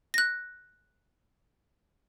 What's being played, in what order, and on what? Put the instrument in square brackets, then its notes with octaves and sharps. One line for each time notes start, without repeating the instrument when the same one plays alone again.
[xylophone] F#6 A#6